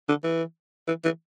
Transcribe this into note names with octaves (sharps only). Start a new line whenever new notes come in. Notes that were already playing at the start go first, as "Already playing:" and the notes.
D3
E3
E3
E3